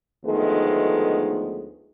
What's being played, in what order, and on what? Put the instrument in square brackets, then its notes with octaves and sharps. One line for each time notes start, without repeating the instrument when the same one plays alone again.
[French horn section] D2 D#3 F3 G#3 A3 B3